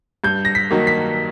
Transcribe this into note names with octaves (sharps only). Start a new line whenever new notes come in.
G2 G6
A#6
B6
D#3 F#3 A#3
B6